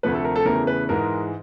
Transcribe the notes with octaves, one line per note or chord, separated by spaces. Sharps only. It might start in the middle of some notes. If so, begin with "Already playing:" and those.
D2 C3 F3 A3 B4
A4
A#4
A4
E2 C#3 E3 A3 A#4
B4
G#2 E3 G#3 A#4